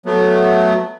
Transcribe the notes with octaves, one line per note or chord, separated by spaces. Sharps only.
F#3 A3 B3